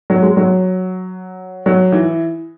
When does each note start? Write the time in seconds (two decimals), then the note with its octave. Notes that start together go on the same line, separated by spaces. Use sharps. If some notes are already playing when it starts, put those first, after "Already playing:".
0.10 F#3
0.23 G#3
0.37 F#3
1.66 F#3
1.93 E3